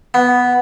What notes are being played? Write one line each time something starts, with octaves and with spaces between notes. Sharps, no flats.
B3